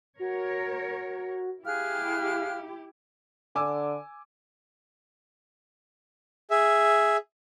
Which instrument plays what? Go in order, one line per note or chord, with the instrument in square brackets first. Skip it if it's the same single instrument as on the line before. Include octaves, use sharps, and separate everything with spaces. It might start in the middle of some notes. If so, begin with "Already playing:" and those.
[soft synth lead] F#4 [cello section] A#4 C#5
[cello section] E4 G4 [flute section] G#4 F6 F#6 [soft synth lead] F5
[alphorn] D3 [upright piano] G#5 D6 E6
[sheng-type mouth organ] G#4 E5